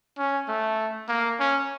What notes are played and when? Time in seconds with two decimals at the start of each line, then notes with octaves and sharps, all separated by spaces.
0.18 C#4
0.48 A3
1.09 A#3
1.40 C#4